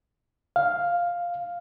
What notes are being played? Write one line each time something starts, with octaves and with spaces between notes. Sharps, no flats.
F5